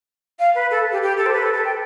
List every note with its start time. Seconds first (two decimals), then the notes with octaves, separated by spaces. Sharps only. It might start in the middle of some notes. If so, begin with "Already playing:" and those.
0.39 F5
0.55 B4
0.71 A4
0.92 G4
1.02 G4
1.17 A4
1.26 C5
1.33 B4
1.43 A4
1.54 A4
1.65 G5